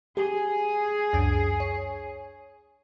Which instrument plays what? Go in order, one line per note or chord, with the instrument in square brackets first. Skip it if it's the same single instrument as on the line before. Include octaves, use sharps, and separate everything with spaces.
[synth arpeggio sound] G4 [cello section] G#4
[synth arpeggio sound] C#2 F#2 D4
C#5